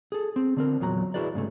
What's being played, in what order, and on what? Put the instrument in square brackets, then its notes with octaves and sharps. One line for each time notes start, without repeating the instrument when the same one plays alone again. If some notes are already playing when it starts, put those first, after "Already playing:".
[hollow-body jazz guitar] G#4 A4
C4
D3 C4 A#4
E2 A#2 F#3 A#5
E4 F#4 G#4 B4 D5
G#2 C#3 A3